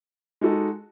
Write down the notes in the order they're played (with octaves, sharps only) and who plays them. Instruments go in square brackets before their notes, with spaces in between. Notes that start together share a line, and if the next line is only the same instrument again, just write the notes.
[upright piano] G#3 D#4 F#4 A4